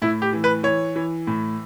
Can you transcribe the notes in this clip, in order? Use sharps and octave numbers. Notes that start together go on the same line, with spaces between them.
A2 E4
G4
E3
B4
E3 C#5
E3
A2